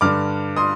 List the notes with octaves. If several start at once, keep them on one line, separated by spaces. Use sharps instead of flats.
G2 D3 D6 F6
C6 D#6